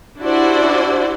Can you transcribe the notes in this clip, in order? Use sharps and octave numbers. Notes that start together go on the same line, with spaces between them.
D4 E4 F#4 G4 C5 D5